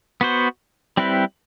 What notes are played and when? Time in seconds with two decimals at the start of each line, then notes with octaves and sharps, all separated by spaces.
0.21 B3 F#4 C5
0.97 G3 C4 E4 B4